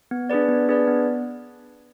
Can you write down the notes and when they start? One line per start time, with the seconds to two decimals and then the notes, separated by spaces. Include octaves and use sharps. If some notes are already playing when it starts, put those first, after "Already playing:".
0.11 B3
0.30 D4 G#4 B4 D5
0.48 B3
0.69 D4 G#4 B4 D5
0.87 B3